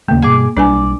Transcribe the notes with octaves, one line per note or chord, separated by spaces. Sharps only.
D#2 C#3 A3 A#3
G2 B2 G#4 D6
B1 G3 D4 B4 D5 G#5